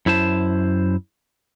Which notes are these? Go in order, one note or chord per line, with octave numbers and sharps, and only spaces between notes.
F#2 E4 C5 A5